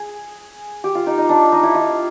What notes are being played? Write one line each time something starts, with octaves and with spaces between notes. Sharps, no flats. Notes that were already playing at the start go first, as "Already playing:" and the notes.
Already playing: G#4
G4
F4
D#4
D#4
D4
D#4
E4
F4